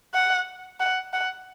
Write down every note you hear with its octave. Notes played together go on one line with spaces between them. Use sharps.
F#5
F#5
F#5